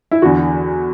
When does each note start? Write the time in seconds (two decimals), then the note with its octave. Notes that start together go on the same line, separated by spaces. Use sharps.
0.11 E4
0.22 E2 D3 F#4